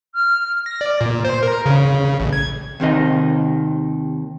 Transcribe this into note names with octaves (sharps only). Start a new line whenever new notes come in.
F6
A#6
D5
A#2
C5
A#4
C#3
A1
G#6
D#2 C3 D#3 D#5